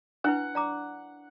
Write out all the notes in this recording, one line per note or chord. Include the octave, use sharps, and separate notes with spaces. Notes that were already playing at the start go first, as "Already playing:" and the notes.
D4 E4 B4 F#5
D5 A#5 D6